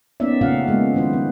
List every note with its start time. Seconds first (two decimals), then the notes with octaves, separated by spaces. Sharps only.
0.20 A#3 B3 C#4 D#4 D5 E5
0.41 A#2 C#3 A3 C4 F5 F#5
0.68 G#3 A#3 B3
0.94 D#3 F#3 E4 B4 C5
1.13 C4